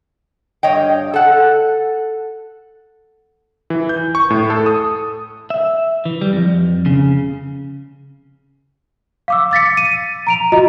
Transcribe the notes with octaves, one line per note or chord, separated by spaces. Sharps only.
G2 C#5 D#5 G5
A4 F#5
E3
G6
C#6
A2
A4
D#6
E5
E3
G3
F2
C#3
F5 D6 E6
D6 A6 B6 C#7
D#7
A#5 D7 F7
F4 F#4 D#5 A#5